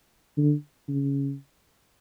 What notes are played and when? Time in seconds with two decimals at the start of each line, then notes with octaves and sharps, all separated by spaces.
0.38 D3
0.88 C#3